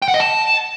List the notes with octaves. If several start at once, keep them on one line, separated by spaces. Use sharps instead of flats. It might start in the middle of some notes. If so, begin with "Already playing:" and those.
G5
F#5
D#5
A5